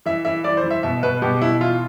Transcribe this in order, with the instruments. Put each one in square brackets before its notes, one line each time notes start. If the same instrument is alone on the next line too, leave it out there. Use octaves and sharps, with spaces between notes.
[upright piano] E3 E5
E3 E5
E3 D5
C5
E3
E5
B2 E5
B2 B4
B2 G4
B2 E4
E3 F4